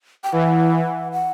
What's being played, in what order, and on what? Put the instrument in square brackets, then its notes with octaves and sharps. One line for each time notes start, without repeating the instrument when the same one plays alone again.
[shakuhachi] G5
[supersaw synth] E3 [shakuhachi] F#5
[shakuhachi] F#5